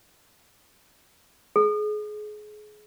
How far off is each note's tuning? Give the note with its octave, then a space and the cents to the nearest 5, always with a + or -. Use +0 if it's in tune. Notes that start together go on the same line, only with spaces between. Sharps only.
G#4 +30